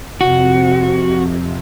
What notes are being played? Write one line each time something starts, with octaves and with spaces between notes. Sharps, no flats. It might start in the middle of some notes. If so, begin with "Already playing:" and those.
F2 C3 F#4